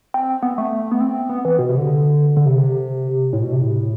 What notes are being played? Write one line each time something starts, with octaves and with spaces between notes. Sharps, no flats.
C4
B3
A3
B3
C4
B3
E3
B2
C3
D3
D3
C3
A2
B2
C3
A2